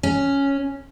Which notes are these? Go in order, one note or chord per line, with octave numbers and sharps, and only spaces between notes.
C#4